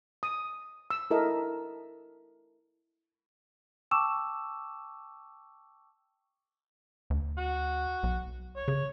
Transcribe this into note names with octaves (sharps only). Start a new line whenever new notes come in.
D#6
E6
E4 A4 A#4 D#5 E5
G5 A5 C#6 D6 E6 E7
D2
F#4
B1
C#5
C#3